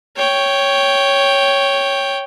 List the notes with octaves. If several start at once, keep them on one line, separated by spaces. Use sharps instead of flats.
C#5 G5